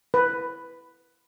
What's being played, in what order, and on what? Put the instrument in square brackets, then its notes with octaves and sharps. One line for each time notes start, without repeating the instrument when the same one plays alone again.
[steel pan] B4